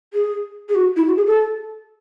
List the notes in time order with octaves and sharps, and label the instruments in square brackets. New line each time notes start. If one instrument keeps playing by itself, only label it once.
[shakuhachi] G#4
G#4
F#4
E4
F#4
G#4
A4